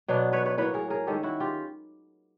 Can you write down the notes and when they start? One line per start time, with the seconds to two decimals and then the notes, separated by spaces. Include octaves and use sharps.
0.08 B2 F#3 B3 D4
0.33 B4 C#5
0.46 B4 C#5
0.58 A2 F#3 A#3 B4 C#5
0.74 G#4 A#4
0.90 G#4 A#4
1.07 D#3 G#3 C#4 G4 A4
1.23 E4 F#4
1.40 F4 G4